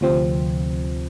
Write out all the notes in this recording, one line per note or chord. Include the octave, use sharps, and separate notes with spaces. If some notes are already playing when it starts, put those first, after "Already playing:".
D2 C3 F3 C4